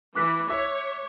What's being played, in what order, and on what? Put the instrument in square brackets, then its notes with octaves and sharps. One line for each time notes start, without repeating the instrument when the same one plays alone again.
[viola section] E3 [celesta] D6 F#6 B6
[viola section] C#5 [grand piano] E5